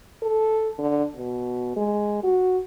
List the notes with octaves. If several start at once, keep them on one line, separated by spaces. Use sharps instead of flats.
A4
D3
B2
G#3
F#4